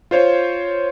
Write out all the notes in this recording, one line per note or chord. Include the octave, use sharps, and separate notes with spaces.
F4 C5 C#5